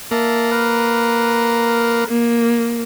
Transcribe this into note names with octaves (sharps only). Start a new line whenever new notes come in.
A#3 E5 A5
A#4 B4
A#3